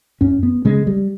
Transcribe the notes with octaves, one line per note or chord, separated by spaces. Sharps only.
F#2 C#4
B3
C#3 G#3
G3